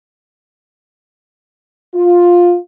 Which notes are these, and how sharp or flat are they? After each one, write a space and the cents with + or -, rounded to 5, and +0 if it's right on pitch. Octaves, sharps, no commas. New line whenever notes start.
F4 +10